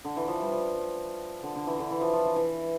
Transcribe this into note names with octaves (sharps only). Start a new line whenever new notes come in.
D3
E3
F3
G3
F3
D3
D3
E3
D3
E3
F3
F3
E3
E3